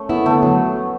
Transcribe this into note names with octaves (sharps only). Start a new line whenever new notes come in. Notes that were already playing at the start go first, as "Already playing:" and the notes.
Already playing: A3 C#4
B3 E4
D3 A3
F#3